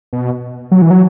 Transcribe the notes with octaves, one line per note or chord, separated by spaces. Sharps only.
B2
F#3
E3
F#3